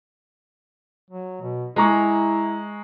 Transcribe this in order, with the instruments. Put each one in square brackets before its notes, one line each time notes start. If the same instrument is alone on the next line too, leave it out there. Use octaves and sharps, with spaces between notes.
[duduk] F#3
B2
[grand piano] G#3 A#5 C#6 [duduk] E4